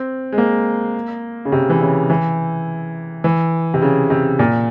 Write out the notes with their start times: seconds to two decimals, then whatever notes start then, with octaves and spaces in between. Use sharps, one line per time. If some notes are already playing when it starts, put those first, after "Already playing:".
Already playing: C4
0.32 G#3
0.38 A#3
1.45 C#3
1.52 C3
1.70 E3
1.81 C#3
2.10 E3
3.24 E3
3.74 C3
3.82 C#3
4.10 C3
4.39 A#2